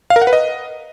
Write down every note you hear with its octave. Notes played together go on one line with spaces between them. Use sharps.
F5
A#4
F#5
B4
D#5